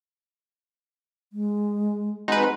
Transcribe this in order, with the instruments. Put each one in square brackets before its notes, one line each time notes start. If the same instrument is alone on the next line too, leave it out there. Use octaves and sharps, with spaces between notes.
[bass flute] G#3
[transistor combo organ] G#3 C4 F#4 [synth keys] D#4 B4